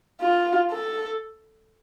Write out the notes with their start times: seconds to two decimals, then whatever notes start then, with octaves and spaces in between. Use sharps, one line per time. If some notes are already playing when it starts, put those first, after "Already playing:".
0.21 F4
0.71 A4